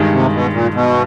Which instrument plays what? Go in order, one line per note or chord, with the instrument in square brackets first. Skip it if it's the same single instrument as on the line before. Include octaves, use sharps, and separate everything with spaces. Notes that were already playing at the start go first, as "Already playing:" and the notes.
Already playing: [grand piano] G2 D#3 G#3
[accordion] C3
B2
A#2
B2